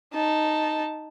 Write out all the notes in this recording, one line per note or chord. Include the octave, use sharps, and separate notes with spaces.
D#4 A5